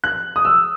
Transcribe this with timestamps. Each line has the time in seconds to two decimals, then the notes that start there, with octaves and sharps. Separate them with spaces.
0.04 F#6
0.36 D#6
0.45 E6